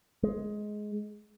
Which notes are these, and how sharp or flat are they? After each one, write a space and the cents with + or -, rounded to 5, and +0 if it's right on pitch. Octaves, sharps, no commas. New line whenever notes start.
G#3 +15